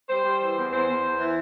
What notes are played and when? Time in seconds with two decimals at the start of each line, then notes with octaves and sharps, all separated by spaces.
0.09 G3 C5
0.25 G3
0.41 E3
0.56 E2
0.72 E2 C5
0.88 E2
1.04 E2
1.19 E3